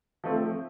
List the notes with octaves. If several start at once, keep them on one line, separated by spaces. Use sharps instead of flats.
F3 A3 C4